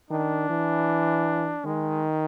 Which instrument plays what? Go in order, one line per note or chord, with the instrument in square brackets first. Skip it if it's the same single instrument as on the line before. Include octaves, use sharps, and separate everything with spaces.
[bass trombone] D#3 [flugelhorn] D4
[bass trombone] E3
[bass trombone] D#3 [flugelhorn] G#3